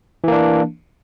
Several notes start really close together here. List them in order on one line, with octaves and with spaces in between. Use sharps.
E3 A#3 D4